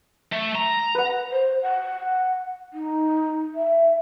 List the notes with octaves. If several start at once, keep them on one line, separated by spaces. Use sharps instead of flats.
A3
A#5
B4 F#5
C5
F#5
D#4
E5